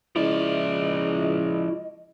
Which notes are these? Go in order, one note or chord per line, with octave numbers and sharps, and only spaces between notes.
C#2 F3 E4 D5 D#5